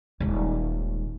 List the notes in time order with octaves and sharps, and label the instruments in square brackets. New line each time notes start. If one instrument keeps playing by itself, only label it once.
[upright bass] D#1 G#3